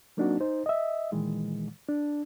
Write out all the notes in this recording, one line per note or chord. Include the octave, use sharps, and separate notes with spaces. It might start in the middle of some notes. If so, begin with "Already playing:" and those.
F#3 A#3 C4 D4 D#4 F#4
D#4 C5
D#5 E5
A#2 D#3 E3 G#3
D4